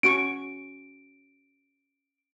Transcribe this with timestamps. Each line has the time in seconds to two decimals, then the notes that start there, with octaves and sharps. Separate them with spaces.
0.03 C#4 F#4 C#6 D7